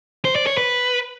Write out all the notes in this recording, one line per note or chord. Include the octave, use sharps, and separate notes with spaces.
C5
D5
C#5
B4